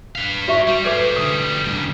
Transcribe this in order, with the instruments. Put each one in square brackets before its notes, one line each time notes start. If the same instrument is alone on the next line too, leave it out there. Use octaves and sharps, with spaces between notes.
[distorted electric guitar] B4 F5
[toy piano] F#4 E5 C#6
[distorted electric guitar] G3
[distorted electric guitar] G#4 C5 [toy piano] A4 B4 D6
[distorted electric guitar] D2 G3 [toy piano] D#6
[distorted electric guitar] G2 C#3